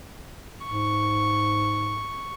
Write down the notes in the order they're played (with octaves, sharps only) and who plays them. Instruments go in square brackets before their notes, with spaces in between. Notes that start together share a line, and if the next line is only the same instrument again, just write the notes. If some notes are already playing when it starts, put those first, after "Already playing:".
[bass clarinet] G#2 [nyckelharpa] C#6